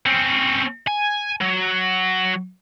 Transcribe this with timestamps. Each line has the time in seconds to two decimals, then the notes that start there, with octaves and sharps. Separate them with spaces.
0.06 C4 C#4
0.88 G#5
1.41 F#3